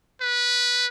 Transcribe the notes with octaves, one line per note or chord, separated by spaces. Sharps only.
B4